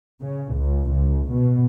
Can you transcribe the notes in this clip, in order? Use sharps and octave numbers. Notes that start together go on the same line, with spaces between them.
C#3
C#2
C#2
B2